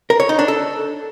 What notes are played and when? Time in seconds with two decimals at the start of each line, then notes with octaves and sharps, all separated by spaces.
0.10 A#4
0.20 C#5
0.29 D#4
0.39 D4
0.48 A4